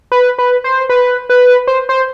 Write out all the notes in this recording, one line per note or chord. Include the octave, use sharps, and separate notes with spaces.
B4
B4
C5
B4
B4
C5
C5